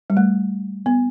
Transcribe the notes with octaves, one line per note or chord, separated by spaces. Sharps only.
G3
A3
B3